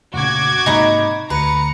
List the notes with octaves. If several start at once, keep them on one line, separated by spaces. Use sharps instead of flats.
F1 A#2 C#3 F#4 D6 G#6
G#2 C3 A#3 D#4 A#5 B5
D2 B4 A#5 C#7